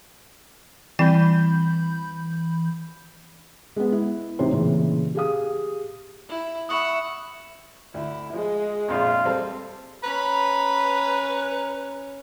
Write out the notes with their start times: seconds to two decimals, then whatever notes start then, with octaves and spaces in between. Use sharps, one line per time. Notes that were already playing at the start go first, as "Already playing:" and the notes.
0.99 E3 G3 C4 G5 B5 G6
3.76 G#3 B3
3.92 E4
4.39 A1 C3 D#4 C5 C6
4.53 A#2 C#3 E3
5.15 G4 G#4 F5 D#6
6.29 E4
6.69 E5 F#5 B5 C#6 D#6
7.94 D2 E4
8.33 F3 G#3
8.88 A#1 F2 F4
9.25 G3 C4 A4
10.03 C#4 B4 A#5 B5